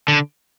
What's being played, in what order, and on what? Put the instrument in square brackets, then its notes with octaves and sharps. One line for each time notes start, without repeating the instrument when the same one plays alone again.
[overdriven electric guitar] D3